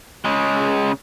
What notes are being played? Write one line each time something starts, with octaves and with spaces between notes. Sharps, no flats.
C#3 G#3